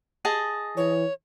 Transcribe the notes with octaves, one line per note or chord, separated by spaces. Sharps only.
G#4 D#5 A5
E3 C#5